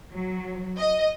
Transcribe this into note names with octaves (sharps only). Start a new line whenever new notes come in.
F#3
D#5